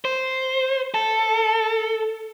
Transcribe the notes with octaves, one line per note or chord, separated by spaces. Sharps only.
C5
A4